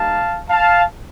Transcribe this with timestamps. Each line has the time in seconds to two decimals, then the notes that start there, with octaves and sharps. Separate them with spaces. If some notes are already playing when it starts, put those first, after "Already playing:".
Already playing: G3 A#3 D#4 G4 F5 A5
0.49 F5 A5